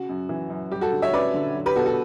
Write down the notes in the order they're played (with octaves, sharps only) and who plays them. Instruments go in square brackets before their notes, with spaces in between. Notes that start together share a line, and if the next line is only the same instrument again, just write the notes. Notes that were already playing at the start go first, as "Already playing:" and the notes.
Already playing: [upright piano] C#3 F#4
F#2
E3
F#2
G3 G4
F#4 A4
D3
C#5 E5
C#4 B4 D5
D3
F#3
G4 B4
B2 F#4 A4
F#4 A4